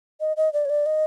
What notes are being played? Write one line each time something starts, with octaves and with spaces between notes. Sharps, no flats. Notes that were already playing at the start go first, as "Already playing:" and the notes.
D#5
D#5
D5
C#5
D5
D#5